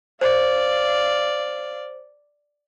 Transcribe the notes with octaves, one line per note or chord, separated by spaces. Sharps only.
C5 D5 F5